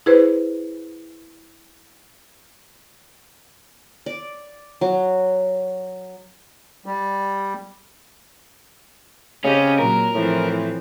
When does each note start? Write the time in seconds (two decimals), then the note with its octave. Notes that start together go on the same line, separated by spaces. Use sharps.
0.06 E4 G#4 B4 C5
4.06 D5
4.81 F#3
6.86 G3
9.44 C#3 C4 C#4 G4 D#5
9.79 A#2 F#3 A#4
10.15 A2 E3 F3 C4